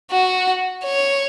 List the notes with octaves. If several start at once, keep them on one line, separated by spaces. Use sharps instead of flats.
F#4
C#5